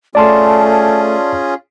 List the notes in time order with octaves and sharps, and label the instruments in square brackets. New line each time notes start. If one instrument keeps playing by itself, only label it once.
[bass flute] A3 [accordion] C#4 F4 G#4 [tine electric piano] D5 A5 C6